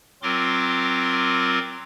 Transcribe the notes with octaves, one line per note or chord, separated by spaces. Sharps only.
F#3 C4 F4 A#4 C6 D6